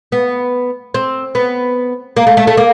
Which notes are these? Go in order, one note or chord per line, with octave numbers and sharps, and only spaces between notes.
B3
C4
B3
A#3
A3
A3
A3
A#3